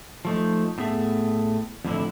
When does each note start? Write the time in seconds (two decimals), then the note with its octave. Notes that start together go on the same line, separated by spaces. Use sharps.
0.25 F3 A3 D#4
0.78 A2 A3 B3 G#4 E5
1.85 F2 A2 D3 E4